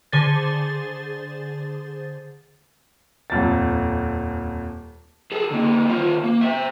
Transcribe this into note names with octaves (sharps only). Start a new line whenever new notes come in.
D3 G#4 C5 A6
D#1 F2 A6
G#4 A4
D3 A#3
D#3 F4
A#3
C5 E5